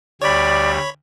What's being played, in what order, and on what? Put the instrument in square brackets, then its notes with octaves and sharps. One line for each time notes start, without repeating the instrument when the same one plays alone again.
[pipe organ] D2 G3 [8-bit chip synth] C#5 B5 [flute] D5